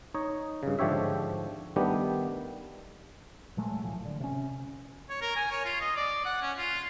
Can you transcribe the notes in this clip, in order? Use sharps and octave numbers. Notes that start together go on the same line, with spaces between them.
D#4 C#5 D#5
G2 C#3
G#2 D3 F3 G4 C#5 E5
D#3 G3 A3 B3 D4 G4
A#2 F#3 G#3 A3
B1 A2 E3 F3
D3
C3 C#4
C#5
A#4
G#5
C#5
F4
D#5
D5
F#5
C#4
F4